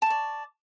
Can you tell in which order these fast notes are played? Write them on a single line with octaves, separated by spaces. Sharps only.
A5 C#6 D5